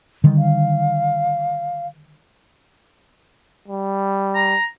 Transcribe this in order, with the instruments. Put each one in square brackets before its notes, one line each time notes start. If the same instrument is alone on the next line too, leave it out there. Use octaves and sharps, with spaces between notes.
[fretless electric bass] D3 D#3 G3
[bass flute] F5
[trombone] G3
[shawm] A#5